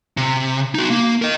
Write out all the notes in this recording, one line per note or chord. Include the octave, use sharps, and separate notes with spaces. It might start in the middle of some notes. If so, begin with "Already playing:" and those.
C3
D#4 F#4
A#3
A#4 D#5